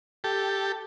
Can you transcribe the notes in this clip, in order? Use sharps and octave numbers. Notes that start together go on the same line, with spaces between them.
G4 A4